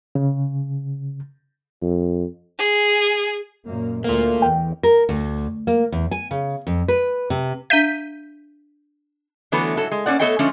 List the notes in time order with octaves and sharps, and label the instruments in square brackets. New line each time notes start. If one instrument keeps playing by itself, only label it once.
[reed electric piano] C#3
[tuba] F2
[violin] G#4
[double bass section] F#2 A#2 A#3
[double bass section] D2 A3 [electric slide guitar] A#3 F4
[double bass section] E2 [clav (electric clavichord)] G5
[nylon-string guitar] A#4
D2
A#3
E2
G#5
C#3
F2
B4
C3
[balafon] D4 E5 F5 [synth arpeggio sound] G6 B6 D#7
[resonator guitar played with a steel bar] D3 E3 F#3 A3 B3 B4
G#2 F#3 A4
G#3
A#3 C#4 D4 G4 D5 F#5
A3 B3 A4 C#5 D#5 G5
D3 F3 G#3 A3 C#4 D4